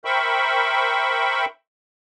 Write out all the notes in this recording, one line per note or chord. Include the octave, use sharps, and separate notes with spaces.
A#4 C5 E5 G5 B5 C#6